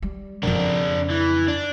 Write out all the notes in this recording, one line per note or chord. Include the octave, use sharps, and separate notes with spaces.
G3
F2 C#3 D4 A#4
E3
D4